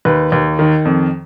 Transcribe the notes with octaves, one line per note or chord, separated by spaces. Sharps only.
D#2 B4
D#2
D#3
F2